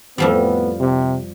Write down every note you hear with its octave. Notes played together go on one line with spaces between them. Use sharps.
F2 A2 F3 G3 B3
C3